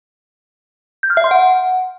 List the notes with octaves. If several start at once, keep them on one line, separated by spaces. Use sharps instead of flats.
G6
F6
E5
C6
F#5